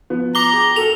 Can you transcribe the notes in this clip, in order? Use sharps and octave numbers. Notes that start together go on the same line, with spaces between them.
F3 B3
A#5 D6 G7
G#4 G5
F#4 A4 A#4 F7